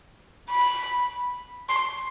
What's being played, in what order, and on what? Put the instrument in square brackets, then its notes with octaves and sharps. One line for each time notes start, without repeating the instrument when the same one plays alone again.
[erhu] B5
C6